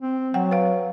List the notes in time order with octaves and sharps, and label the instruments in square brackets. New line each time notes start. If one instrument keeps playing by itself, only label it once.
[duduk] C4
[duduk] F#3 [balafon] F#5 G5
[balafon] B4 F5